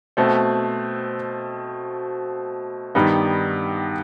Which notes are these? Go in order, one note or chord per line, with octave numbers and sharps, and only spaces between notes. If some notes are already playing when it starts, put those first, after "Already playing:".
B2 A3 C4
G2 D#3 G3 B3 D#4